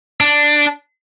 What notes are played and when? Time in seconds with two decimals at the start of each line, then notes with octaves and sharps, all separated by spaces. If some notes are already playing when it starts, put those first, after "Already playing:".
0.21 D4